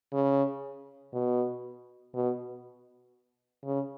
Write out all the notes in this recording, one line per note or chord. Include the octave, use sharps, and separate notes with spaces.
C#3
B2
B2
C#3